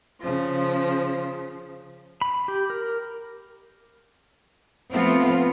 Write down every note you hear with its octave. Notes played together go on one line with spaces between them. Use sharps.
C#3 F3
B5
G4
A#4
F3 A3 B3 C4 F4